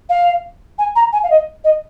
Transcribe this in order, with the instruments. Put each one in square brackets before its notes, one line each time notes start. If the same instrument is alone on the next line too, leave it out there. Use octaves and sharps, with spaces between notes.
[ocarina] F5
G#5
A#5
G#5
F5
D#5
D#5